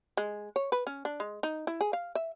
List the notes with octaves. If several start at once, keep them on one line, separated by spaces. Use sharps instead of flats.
G#3
C#5
B4
C#4
D4
G#3
D#4
E4
G#4
F5
E5